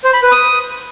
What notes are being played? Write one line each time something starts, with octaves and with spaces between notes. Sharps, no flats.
C5
B5
B4
D#6